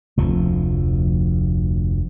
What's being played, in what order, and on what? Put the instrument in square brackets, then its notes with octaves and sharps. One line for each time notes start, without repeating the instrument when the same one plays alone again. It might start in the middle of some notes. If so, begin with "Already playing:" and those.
[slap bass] F1 D2 F3